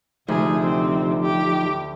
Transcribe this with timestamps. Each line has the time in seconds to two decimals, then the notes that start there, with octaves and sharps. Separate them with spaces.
0.28 D2 C3 F3 D#4 G#4
0.63 C4
1.22 G4